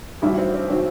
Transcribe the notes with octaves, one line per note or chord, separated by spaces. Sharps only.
A1 G2 D#3 F#3 E4
C4
C4
D#3 F#3 C4